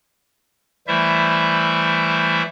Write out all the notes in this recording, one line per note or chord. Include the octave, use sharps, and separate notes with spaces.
E3 G3 A3 E4 C5 E5